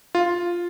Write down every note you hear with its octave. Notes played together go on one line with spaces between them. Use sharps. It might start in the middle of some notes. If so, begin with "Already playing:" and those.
F4